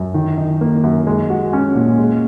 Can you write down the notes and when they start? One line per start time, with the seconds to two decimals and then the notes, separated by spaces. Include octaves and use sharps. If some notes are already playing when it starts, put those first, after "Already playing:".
Already playing: F#2
0.14 D#3
0.37 D#4
0.61 A#3
0.84 F#2
1.07 G#3
1.30 F#4
1.53 C#4
1.75 A#2
1.99 G#3